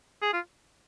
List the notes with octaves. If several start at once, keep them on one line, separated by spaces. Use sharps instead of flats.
G#4
F4